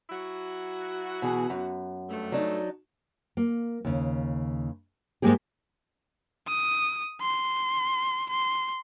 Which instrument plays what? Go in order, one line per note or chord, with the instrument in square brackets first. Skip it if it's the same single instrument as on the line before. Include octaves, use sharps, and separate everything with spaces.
[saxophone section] F#3 E4 F#4
[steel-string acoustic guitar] B2 E3 G#4
F#2
[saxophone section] G2 A3
[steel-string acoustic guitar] F#3 D4 D#4
[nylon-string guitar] A#3
D#2 C#3
G#2 C#3 G#3 A#3 G4 G#4
[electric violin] D#6
C6
C6